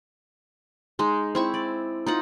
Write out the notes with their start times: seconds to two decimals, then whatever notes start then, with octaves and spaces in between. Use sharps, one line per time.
0.99 G#3 D#4
1.35 C4 E4 C#6
1.54 D5
2.06 D#4 F4 F#5